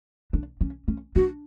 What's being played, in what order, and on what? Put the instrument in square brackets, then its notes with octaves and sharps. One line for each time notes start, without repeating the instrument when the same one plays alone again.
[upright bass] D4
C#4
C#4
[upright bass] D4 [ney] F#4